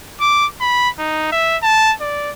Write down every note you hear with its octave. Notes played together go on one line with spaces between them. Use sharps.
D6
B5
D#4
E5
A5
D5